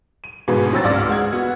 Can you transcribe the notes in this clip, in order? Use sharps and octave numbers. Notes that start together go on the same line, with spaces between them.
D#7
G1 G#2 B2 G#4 B4
A2 F#3 C4 E6 A6
C#2 G#2 D5 E6 F6 A#6
G#3 F#5 G#6
B3 F#4 F#5